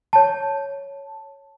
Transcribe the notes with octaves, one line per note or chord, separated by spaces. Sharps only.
C#5 A5